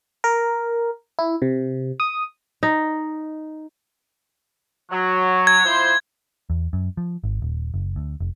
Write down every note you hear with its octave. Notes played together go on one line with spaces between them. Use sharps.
A#4
E4
C3
D#6
D#4
F#3
G#6
F3 E4 C5
E2
F#2
F3
G#1
D#1
F#1
D2
F1